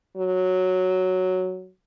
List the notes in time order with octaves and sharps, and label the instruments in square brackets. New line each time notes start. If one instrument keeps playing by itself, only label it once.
[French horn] F#3